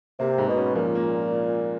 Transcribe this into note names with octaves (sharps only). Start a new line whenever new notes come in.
C3 A#3
G#2
B2
C#4
A#2 F3
A#3